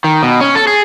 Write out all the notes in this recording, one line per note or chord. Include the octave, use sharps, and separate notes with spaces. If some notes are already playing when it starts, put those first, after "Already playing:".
D#3
B2
C#4
A4
G#4